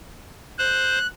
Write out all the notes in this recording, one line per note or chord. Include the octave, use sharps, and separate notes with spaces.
C5 F#6